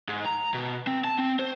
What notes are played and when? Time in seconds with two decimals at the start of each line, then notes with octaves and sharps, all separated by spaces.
0.08 G#2
0.25 A#5
0.54 B2
0.87 C4
1.04 A5
1.19 C4
1.40 C5